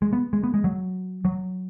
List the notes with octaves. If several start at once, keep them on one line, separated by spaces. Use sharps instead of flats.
G#3
B3
G#3
B3
G#3
F#3
F#3